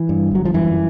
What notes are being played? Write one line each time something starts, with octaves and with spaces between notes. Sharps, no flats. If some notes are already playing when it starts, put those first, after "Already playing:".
Already playing: E3
G2
G1 F#3
F3
F#2 E3